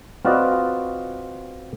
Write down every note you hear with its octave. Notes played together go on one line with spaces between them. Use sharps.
C4 F4 F#4 B4 D5 D#5